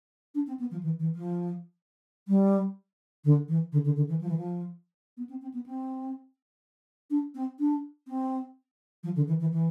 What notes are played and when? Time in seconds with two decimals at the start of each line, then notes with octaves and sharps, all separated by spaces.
0.35 D4
0.47 C4
0.59 B3
0.71 F3
0.83 E3
0.99 E3
1.15 F3
2.28 G3
3.24 D3
3.48 E3
3.72 D3
3.85 D3
3.96 D3
4.09 E3
4.21 F3
4.29 E3
4.37 F3
5.17 B3
5.29 C4
5.42 C4
5.54 B3
5.66 C4
7.10 D4
7.35 C4
7.59 D4
8.08 C4
9.03 F3
9.16 D3
9.27 E3
9.40 E3
9.52 E3